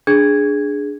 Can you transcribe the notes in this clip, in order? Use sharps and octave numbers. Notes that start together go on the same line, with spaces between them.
D4 G#4 G#6